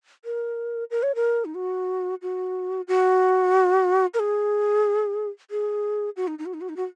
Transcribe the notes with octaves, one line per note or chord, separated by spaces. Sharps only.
A#4
A#4
C#5
A#4
D#4
F#4
F#4
F#4
A#4
G#4
G#4
F#4
D#4
D#4
F#4
D#4
F#4
D#4
F#4